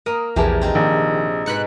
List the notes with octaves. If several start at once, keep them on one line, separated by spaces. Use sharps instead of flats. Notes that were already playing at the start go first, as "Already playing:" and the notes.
A#3 A#4 D#6
A#1 E2 C3 E3 A#3 G4 G#4 A5
C4 D#4 F4
A#1 D#3
G#2 B2 B5 F#6 C#7